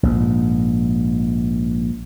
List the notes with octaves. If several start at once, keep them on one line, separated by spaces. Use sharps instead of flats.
A#1 G#2